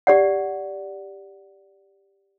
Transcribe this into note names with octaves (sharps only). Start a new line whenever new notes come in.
G4 D5 F#5